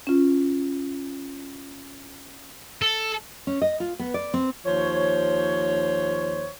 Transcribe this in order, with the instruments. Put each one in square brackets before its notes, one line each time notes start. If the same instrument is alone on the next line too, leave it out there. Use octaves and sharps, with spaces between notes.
[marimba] C#4 F4
[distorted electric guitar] A4
[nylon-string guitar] C#4
D#5
F4
B3
D5
C4
[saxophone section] D#2 F3 C5 C#5